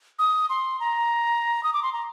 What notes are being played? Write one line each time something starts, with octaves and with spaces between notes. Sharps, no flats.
D#6
C6
A#5
D#6
D6
C6
A#5